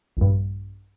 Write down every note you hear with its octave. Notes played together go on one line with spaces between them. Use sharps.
A#1 G2